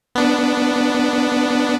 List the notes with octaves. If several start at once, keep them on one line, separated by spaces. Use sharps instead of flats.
B3 D4